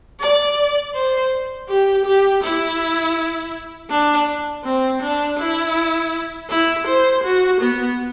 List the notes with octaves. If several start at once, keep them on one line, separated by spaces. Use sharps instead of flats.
D5
C5
G4
G4
E4
D4
C4
D4
E4
E4
C5
F#4
B3